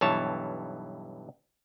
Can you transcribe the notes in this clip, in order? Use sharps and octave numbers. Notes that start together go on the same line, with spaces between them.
B1 G2 E3 C#5 A5